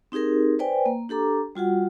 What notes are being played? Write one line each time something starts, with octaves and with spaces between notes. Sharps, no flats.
C4 D#4 G4 G#4 A#4
B4 C5 D5 G5 G#5
A#3
D4 G4 A4 A#5 D6
G3 F4 F#4 F#5